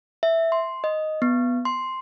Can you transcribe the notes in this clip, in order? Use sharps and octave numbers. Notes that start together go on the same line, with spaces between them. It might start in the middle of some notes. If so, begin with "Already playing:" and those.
E5
C6
D#5
B3
C6